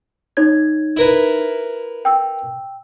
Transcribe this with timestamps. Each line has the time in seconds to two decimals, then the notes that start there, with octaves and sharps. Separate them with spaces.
0.37 D#4 C#5 G#6
0.97 E4 A#4 B4
2.05 G5 E6